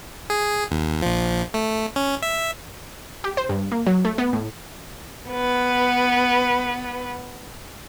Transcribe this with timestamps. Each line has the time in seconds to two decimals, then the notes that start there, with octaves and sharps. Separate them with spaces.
0.30 G#4
0.71 D#2
1.02 A#1 F3
1.54 A3
1.96 C#4
2.22 E5
3.24 G4
3.37 C5
3.49 G2
3.72 A#3
3.87 F#3
4.05 A3
4.18 B3
4.33 A2
5.31 B3 B4